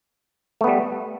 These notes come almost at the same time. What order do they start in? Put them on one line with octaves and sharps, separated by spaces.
A3 B3 G3